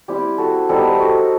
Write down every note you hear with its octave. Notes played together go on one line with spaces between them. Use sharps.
G3 C4 E4 G4
F#4 A4
G3 B3 D#4 A4 C5
G4 B4
A4 C5
F#4 A4